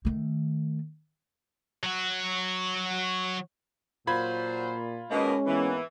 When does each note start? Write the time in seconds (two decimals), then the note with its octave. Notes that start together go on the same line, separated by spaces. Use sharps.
0.05 D#3 A3
1.83 F#3 F#4
4.07 A#2 F#3 F4 C5 B5 G#6
5.11 B2 D#3 G#3 A#3 C#4 A#4 B4 D#5
5.46 G#2 E3 A#3 B3